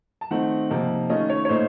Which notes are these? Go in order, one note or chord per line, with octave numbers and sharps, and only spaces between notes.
A5
D#3 A3 C4 D#4 F#5
C3 F3 A#3 D#4
D#3 A3 C#4 F4 D#5
C#5
C#5
A#2 A3 D#4 C5